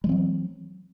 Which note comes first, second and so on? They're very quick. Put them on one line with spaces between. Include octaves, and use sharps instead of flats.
G#3 E3 C4 F#3